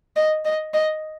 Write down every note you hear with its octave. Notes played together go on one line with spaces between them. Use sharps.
D#5
D#5
D#5